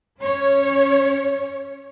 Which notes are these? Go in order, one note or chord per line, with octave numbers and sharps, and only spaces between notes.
C#4 C#5